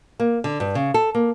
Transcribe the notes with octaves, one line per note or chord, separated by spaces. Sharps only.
A#3
D3
G2
C#3
A4
A#3